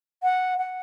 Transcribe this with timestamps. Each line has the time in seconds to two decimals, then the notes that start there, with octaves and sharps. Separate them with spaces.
0.23 F#5
0.58 F#5